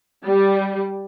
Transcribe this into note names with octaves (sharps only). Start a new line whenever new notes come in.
G3